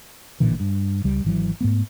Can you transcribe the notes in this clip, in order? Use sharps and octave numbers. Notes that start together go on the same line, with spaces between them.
A1 A#2 D3 E3
G2
C#2 G3
G#1 E3 F#3
G#2 A3 B3